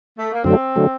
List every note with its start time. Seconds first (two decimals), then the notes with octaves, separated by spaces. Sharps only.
0.18 A3
0.32 A#3
0.43 F#2 D3 F#3 A3 C4
0.76 D3 F#3 A3